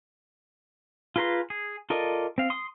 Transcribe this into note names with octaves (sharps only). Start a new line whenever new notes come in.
F4 G#4 B4 A#5 C6
G#4
F4 A4 A#4 D5 D#5
C4 F5
C6 D#6